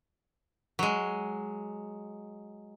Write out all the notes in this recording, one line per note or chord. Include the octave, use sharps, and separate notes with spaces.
F#3 G#3